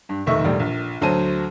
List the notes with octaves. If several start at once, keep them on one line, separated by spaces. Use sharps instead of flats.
G2
F1 B1 D#3 A3 E5 C#6
E1 A2 G3
A#1
D2 F#3 C5 A5 D#7